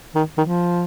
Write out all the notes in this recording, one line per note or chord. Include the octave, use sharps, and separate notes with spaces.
D#3
D#3
F3